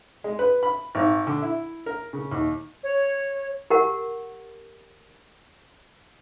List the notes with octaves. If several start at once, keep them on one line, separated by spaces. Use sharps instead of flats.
G#3
B4
B5
G#1
D3
E4
A#4
C#3
D#2
C#5
G4 A#4 F#5